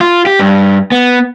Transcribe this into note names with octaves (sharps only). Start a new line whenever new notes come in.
F4
G4
G2
B3